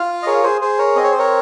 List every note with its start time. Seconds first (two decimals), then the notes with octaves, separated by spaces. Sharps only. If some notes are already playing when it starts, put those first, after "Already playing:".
Already playing: F4 F5
0.23 D#5
0.27 G#4 A#4 C#5
0.44 G#4 C5
0.61 G#4 C5
0.79 A#4 C#5
0.96 C4 D#5
1.04 C#5
1.11 C5
1.19 A#4 C#5